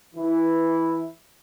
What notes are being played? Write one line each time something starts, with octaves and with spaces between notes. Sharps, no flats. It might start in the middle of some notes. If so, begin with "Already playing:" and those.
E3 E4